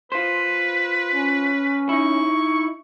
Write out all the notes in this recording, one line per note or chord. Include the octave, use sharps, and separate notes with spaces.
F4 B4 C5
C#4
D#4 E4 C#6